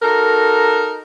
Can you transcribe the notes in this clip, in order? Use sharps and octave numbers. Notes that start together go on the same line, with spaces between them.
D#4 F#4 A4 A#4